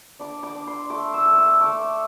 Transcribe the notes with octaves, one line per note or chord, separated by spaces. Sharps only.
D4 D6
D6
D4
C6
A3 D6
E6
A3
E6
A3 D6